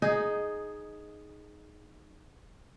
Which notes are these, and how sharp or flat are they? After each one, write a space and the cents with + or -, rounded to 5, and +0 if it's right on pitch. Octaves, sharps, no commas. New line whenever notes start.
D#4 -5 G#4 +10